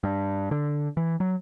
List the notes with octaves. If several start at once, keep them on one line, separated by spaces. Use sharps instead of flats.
G2
D3
E3
F#3